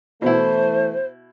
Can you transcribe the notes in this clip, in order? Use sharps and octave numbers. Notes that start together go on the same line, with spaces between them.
B2 E3 A3 E4 C5